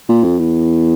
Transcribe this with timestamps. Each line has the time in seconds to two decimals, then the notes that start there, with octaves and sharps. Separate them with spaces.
0.09 A#2
0.24 F2
0.39 E2